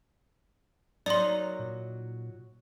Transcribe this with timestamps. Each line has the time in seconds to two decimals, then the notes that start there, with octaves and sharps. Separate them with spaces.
1.06 F#3 A#3 D#4 D5 C6
1.59 A#2